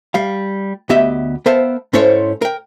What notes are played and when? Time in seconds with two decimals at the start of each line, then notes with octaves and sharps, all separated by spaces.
0.14 G3 F5
0.89 D2 B3 G4 D#5 E5
1.46 B3 A#4 C5 E5 F5 A5
1.93 G#2 C#4 E4 A4 C5 C#5
2.42 A#4 G5